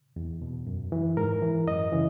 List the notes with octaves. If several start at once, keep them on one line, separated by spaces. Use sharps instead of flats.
E2
B2
F#2
E3
G#2 A#4
E3
F#2 D#5
C#3 E3